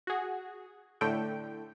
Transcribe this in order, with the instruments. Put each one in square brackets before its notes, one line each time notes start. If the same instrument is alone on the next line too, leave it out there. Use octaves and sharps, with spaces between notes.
[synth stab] F#4 G#4
A2 D3 A3 G5